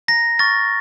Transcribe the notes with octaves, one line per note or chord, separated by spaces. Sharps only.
A#5 A#6
C#6 F6 A6